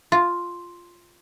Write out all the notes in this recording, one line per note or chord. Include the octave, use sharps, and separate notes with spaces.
F4